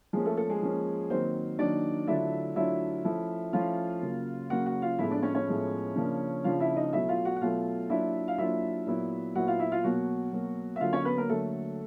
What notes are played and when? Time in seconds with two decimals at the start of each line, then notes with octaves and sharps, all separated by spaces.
0.13 F3 G#3 A#3 C#4 G#4
0.25 A3 A4
0.37 A3 A4
0.49 G#3 G#4
0.62 F3 A#3 C#4
1.10 D#3 F#3 A#3 C4 D#4 C5
1.59 D#3 F#3 A#3 D4 D#4 D5
2.07 D3 F#3 A3 D4 E4 F4 E5
2.55 D3 F#3 A3 D4 E4 F4 E5
3.04 F3 A3 C#4 E4
3.53 F3 A3 C#4 E4 F4 F5
4.02 C#3 F#3 A#3
4.50 C#3 F#3 A#3 F#4 F#5
4.66 F#4 F#5
4.82 F4 F5
4.99 A2 F3 G#3 B3 E4 E5
5.11 D4 D5
5.22 C#4 C#5
5.35 C#4 C#5
5.47 A2 F3 G#3 B3
5.96 C#3 F3 A#3 D4
6.44 C#3 F3 A#3 D4 F4 F5
6.60 E4 E5
6.76 D#4 D#5
6.93 B2 F#3 A3 E4 E5
7.09 F4 F5
7.25 F#4 F#5
7.36 F#5
7.41 B2 F#3 A3 F4 F5
7.90 F#3 A#3 D4 E4 F4 E5
8.28 F5
8.38 F#3 A#3 D4 E4 F4 E5
8.86 A#2 F#3 B3 E4
9.35 A#2 F#3 B3 E4 F#4 F#5
9.47 F4 F5
9.59 E4 E5
9.72 F4 F5
9.84 B2 F#3 A#3 F#4 F#5
10.33 B2 F#3 A#3
10.76 E5
10.81 D3 F#3 A#3 F4 F5
10.93 C#4 C#5
11.05 B3 B4
11.17 A#3 A#4
11.29 D3 F#3 A3 A#3 A4